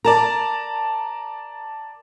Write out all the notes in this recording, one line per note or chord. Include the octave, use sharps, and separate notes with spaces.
A#4 D5 A5 A#5